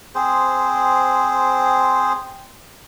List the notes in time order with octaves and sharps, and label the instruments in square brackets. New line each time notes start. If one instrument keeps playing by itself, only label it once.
[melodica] C4 G#4 C5